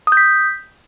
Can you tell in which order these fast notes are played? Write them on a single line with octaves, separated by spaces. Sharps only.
D#6 G6 B6